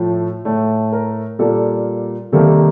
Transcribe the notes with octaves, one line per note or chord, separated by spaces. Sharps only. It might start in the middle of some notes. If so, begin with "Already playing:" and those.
Already playing: A2 F3 A3
A2 A3
A#4
A#2 G3 A#3 A4
C3 D#3 G3 A#3 A4
A4